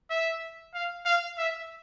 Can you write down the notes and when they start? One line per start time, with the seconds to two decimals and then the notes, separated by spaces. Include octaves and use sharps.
0.10 E5
0.74 F5
1.06 F5
1.38 E5